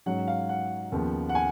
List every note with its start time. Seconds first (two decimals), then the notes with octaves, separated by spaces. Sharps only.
0.06 G#2 F#3 C#4 F#5
0.28 F5
0.49 F#5
0.92 D#2 C#3 F3 B3
1.29 F#5
1.35 G#5